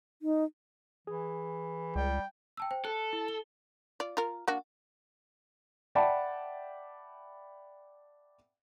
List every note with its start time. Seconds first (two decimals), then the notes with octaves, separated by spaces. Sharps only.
0.22 D#4
1.07 E3 G#4
1.96 C#2 G3 G5
2.57 G5 A5 E6
2.71 C5 G5
2.85 A4 F#6
3.13 E4
3.28 G7
4.00 F4 D5
4.17 F4 A#4
4.48 A#3 D4 F#4
5.95 D5 E5 F#5 G5 A5 B5